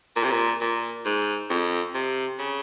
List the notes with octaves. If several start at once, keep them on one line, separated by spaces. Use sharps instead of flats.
A#2
C3
A#2
A#2
G#2
F2
C3
C#3